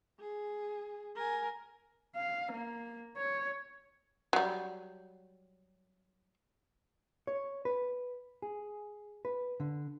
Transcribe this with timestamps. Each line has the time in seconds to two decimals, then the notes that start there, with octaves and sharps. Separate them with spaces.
0.20 G#4
1.16 A#4 G#5
2.16 F5
2.52 A#3
3.17 C#5
4.33 F#3 G3
7.27 C#5
7.65 B4
8.42 G#4
9.25 B4
9.60 D3